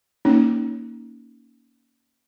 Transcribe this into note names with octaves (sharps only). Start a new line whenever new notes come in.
A#3 C#4 D#4